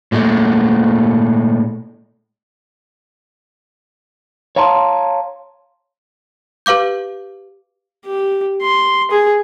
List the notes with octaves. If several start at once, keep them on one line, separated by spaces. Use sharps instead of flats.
A#2 G#3 A3
C#5 F5 A5 A#5 C6
G4 B4 F5 D6 G6
G4
C6
G#4